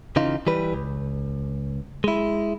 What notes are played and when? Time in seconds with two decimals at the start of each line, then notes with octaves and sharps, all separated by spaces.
0.16 C#3 E3 D#4 F4
0.47 E3 G3 B4
0.73 C#2
2.04 G#3 E4